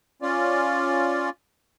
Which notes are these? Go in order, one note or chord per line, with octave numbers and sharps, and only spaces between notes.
C#4 F4 D5